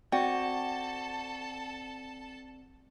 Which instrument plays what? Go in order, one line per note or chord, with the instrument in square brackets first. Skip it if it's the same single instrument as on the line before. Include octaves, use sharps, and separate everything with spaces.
[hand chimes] C4 D5 [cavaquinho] F#4 [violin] A4 A5 [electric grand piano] G5